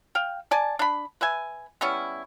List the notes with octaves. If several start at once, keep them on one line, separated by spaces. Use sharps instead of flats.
F5 G5
D5 G#5 A5
D4 B5
B4 E5 G#5
G3 B3 C#4 E4